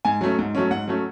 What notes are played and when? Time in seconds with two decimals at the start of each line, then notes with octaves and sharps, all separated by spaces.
0.05 G#2 G#5
0.21 F#3 A3 C#4
0.39 G#2
0.55 F#3 A3 C#4
0.71 G#2 F#5
0.88 F#3 A3 C#4